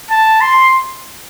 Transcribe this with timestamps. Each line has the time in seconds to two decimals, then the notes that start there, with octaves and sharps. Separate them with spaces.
0.10 A5
0.41 C6